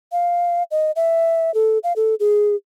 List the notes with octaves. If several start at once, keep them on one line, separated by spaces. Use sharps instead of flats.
F5
D#5
E5
A4
F5
A4
G#4